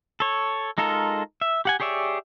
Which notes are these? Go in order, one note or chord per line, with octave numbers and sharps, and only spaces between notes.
A4 C#5
G#3 D#4 F4 A4 A#4
E5
G4 F#5 G#5
G4 G#4 C#5 D5 E5